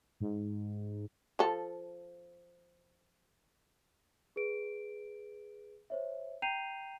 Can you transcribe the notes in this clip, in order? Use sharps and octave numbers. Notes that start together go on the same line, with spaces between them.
G#2
F3 A4
G#4 B4 D7
C5 C#5 E5
G5 A#5 G6 C7 D#7 F7